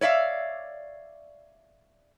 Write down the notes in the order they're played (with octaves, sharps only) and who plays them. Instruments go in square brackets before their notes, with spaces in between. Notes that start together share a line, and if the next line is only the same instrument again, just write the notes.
[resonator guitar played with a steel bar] C#5 D5 E5 F5